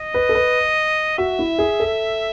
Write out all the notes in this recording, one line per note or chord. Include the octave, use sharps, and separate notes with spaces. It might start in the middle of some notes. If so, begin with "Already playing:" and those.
Already playing: D#5
B4
A4
B4
F#4 E5
E4
G#4
A4